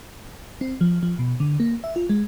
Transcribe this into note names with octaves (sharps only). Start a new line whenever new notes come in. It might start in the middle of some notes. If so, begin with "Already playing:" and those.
C4
F3
F3
B2
D3
A#3
E5
F4
G#3